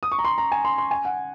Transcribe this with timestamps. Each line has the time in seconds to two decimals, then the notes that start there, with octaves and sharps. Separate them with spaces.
0.03 D#6
0.12 C#6
0.19 A#5
0.24 C6
0.38 A#5
0.52 G#5
0.65 C6
0.78 C6
0.91 G#5
1.05 F#5